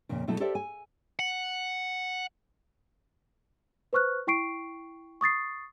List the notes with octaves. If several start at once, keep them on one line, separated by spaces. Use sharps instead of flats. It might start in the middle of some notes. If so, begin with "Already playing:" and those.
F2 A#2 C#3
B2 F#3 A3 E4 A4
G4 A4 A#4 C5 D5 E5
G#5
F#5
B4 C5 C#6 F6 F#6
E4 G5 C#6 C7 D7
C#6 D#6 A6 C7